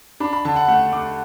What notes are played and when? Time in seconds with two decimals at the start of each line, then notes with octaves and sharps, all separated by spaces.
0.20 D4 B5
0.33 B5
0.45 D3 A5
0.56 F#5
0.68 A3 F#5
0.92 A3 D6